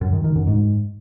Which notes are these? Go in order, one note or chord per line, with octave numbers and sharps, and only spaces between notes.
F#2
D#3
D#3
F#2
G#2